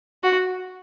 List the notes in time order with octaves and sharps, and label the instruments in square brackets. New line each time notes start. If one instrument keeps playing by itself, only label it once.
[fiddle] F#4